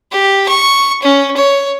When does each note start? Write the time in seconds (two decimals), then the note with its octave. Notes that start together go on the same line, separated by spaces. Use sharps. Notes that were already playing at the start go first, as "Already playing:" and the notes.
0.12 G4
0.48 C#6
1.02 C#4
1.37 C#5